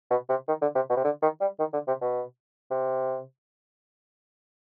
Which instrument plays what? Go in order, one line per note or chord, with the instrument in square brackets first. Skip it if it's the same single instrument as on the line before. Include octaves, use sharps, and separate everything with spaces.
[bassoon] B2
C3
D#3
D3
C3
B2
C3
D3
D#3
G3
D#3
D3
C3
B2
C3